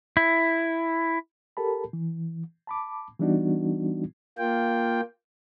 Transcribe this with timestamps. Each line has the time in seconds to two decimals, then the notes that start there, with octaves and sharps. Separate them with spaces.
0.17 E4
1.57 G4 A4 A#4 A5 B5
1.93 E3
2.67 A5 B5 D6
3.19 E3 G3 B3 D4 D#4 F#4
4.38 A#3 F4 G5